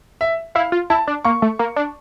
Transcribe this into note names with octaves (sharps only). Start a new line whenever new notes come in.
E5
E4 F5
F4
E4 A5
D4
A#3 C#6
A3
A#3
D4